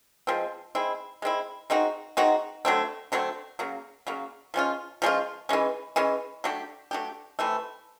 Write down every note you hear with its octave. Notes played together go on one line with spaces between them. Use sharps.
F3 G#3 C4
G#3 C4 E4
G#3 C4 E4
G#3 C4 D#4 F#4
G#3 C4 D#4 F#4
D3 F#3 A3 C4
D3 F#3 A3 C4
C#3 F#3 A#3
C#3 F#3 A#3
F3 G#3 C#4 F4
F3 G#3 C#4 F4
E3 G#3 C#4
E3 G#3 C#4
F#3 A3 D4 G4
F#3 A3 D4 G4
C3 E3 A3